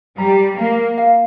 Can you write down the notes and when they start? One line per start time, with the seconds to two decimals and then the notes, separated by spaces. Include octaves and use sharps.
0.18 G3 A#5
0.57 A#3 A#5
0.98 F5